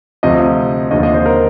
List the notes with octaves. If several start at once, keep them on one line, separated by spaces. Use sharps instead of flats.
D2 C3 F3 D#5
D#2 D3 F3 D#5
D#5
C5
A#4